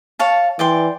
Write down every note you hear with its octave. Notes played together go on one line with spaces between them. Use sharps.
C#5 F5 A5
E3 D5 G5 C6